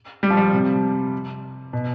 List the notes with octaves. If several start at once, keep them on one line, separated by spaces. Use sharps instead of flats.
G3
F3
G3
C3
B2